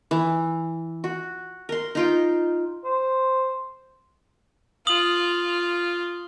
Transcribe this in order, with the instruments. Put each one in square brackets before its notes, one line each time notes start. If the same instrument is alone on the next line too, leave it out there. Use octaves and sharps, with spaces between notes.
[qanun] E3
F#4
A#4 C6
D#4 F4 G5
[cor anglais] C5
[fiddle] F4 [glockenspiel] D#6 F#7